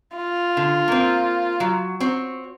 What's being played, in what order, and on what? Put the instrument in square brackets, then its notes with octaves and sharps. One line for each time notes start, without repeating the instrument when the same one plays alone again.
[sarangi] F4
[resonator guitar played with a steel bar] D3
A#3 C4
F#3
C4 F#4 C#5